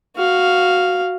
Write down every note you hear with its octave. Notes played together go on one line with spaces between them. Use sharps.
F#4 F5